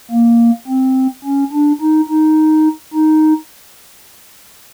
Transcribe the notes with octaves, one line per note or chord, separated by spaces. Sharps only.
A#3
C4
C#4
D4
D#4
D#4
D#4